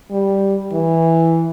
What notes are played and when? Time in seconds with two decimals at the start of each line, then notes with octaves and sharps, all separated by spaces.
0.11 G3
0.73 E3